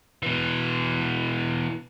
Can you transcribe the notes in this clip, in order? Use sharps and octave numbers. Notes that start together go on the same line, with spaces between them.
B2 E3